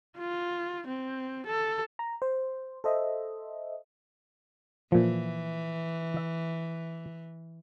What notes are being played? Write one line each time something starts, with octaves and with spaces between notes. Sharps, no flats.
F4
C4
A4
A#5
C5
A4 C5 D#5 E5
A#2 E3 F3
E5